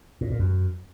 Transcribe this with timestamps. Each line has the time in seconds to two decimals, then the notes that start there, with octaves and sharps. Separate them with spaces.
0.21 A2
0.30 A#2
0.39 F#2